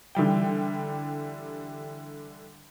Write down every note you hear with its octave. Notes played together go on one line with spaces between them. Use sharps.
D3 E3 G3 G5